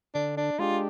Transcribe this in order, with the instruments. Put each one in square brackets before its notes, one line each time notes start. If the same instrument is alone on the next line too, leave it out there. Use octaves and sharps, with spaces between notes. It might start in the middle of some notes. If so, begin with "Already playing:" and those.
[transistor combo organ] D3 [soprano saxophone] D4
[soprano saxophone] D4
[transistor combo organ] G#3 D4 G4 [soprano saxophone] F4